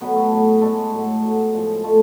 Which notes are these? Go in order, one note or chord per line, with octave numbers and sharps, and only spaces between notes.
B2 F#3 A3 B3 B4
A3 A4
A2 F#3 A3
B2 G#3 A3 A4
A2 F#3 A3
B2 F#3 A3
A2 F3 G#3
A2 F3 G#3 A3 A4